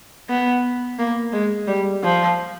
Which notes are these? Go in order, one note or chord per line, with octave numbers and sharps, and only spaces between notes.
B3
A#3
G#3
G3
F3